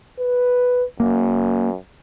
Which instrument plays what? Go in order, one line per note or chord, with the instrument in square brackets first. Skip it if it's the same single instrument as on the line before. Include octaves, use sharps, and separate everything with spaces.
[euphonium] B4
[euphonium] F#2 [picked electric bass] A#3